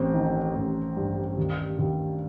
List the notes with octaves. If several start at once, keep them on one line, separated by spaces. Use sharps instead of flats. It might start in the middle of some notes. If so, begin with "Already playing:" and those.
Already playing: A1 C4
D#3
A1
G2
D#2
D#2